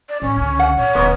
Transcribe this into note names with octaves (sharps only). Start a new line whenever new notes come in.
D5
A2 C#4
C#2 D3
F#5
A#2 C#5
D#1 G#2 D3 B3